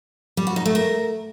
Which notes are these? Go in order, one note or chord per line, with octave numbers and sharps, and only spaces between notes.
G3
F#4
D#4
A3
A#4